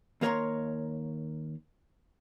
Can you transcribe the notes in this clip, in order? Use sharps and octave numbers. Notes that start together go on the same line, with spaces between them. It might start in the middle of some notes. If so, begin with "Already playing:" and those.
D#2 A#3 A#4 C#5 A#5 C6